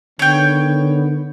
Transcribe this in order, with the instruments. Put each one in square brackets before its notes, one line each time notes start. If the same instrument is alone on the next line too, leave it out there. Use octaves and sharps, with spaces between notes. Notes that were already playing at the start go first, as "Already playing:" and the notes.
[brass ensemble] D3 D#3 B3 [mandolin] C#5 G5